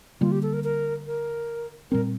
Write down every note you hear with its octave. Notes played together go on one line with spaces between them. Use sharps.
D3 G3 A#3 F4
G4
A4
A#4
A#4
A#4
A#2 G3 C4 A#4